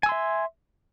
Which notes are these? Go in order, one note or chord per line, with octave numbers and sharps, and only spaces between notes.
E5 G#5 C6 E6